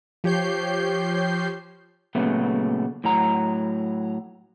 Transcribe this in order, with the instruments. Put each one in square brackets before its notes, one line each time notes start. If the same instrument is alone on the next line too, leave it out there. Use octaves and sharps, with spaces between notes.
[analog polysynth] F3 G4 C#5 G6 C7
[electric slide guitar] A#2 C#3 F#3 A3 B3
A2 F#3 A#5